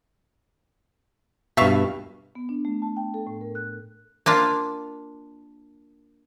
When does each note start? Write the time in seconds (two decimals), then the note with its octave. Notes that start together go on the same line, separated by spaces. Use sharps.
1.57 G2 B2 E5 F5 C#6
2.35 B3
2.49 D4
2.65 A3
2.82 A5
2.97 G5
3.14 A4
3.27 A2
3.41 A#4
3.55 F#6
4.26 A#3 D4 F4